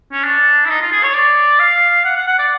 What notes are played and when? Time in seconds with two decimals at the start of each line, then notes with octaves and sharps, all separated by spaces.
0.12 C#4
0.24 D4
0.65 E4
0.69 D#4
0.81 F4
0.92 G#4
1.03 C#5
1.14 D5
1.59 F5
2.05 F#5
2.16 F#5
2.27 F#5
2.39 D5